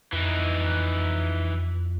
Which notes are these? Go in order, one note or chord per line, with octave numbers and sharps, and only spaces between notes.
F2 E3 D#4